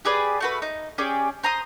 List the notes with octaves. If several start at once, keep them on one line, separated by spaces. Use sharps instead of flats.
G4 G#4 B4 D5
A3 F#4 B4
D#4
C#4 G4 G#4 D5
C5 A#5 C6 D#6